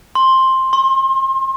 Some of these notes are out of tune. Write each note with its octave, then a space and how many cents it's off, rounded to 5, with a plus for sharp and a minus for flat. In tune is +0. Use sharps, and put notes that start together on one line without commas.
C6 +10
C6 +35